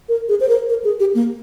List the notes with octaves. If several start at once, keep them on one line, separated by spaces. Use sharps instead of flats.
A#4
G#4
C5
A#4
A#4
G#4
G4
A#3